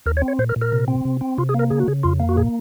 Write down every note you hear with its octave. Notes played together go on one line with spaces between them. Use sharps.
D#2 A#4
C#5
C4
C#5
A#2 C5
A#4
A#2
A#4
C3
C4
C3
C4
C3 F4
G#4
A#3 A#4
C#3 G#4
F#4
C#3 G#4
F2 F4
A#3
F#4
A#2 G#4